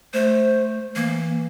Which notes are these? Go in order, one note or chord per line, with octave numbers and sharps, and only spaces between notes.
A3 C5
E3 A#3